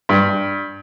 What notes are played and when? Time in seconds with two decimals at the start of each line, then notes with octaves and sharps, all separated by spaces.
0.09 G2